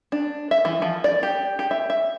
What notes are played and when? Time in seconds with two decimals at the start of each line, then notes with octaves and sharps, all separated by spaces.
0.12 D4
0.51 E5
0.65 E3
0.82 F3
1.04 D5
1.23 G4
1.59 G4
1.71 E5
1.90 E5